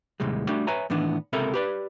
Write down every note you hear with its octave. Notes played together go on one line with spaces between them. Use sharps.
D#2 A2 C3 G3 G#3
G3 A3 D4 F#4 G4
B4 C#5 E5 G#5 A#5
A2 D#3 E3 B3 D4
C#2 C3 A4 A#4 E5 B5
G4 B4 D5